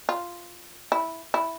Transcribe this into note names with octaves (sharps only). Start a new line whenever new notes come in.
F4
E4
E4